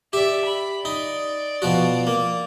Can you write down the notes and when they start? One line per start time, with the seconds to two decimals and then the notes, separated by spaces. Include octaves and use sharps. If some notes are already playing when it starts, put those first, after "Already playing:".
0.13 G4 D5 E5
0.45 B5
0.85 D#4 D5
1.62 B2 F3 F#4
2.07 A#3